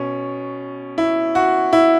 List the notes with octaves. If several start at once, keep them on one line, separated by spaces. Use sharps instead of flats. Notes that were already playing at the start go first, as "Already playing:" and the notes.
Already playing: B2 C#4
E4
F#4
E4